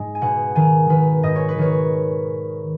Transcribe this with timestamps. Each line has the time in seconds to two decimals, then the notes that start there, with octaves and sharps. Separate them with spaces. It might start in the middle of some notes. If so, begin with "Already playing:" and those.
Already playing: G#2 G#3 D#5
0.15 G#5
0.21 B2 F#5
0.55 D#3 G#5
0.90 D#3 B4
1.23 G#2 D#5
1.36 C#5
1.49 B4
1.58 D#3 C#5